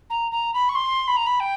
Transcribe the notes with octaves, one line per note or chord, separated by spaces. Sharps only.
A#5
A#5
B5
C#6
C6
B5
A#5
B5
G5